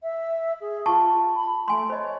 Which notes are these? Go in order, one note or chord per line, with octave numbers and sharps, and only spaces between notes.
E5
G#4
F4 A5 C#6
B5
A3 G#5 C6
C5 C#5 D#5